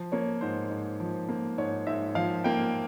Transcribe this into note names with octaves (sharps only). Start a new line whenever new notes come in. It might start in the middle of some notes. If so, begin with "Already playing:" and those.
Already playing: F3
A#3 C#5
G#2 C5
G#2
F3
A#3
G#2 C#5
G#2 E5
F3 F5
A#3 G5